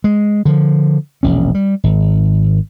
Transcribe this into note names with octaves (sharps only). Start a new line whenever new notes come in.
G#3
D3 F3
E1 A#1 C#4
G3
G#1